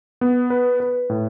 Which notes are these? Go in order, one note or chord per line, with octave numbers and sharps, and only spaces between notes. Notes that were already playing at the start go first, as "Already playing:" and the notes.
B3
B4
B4
A2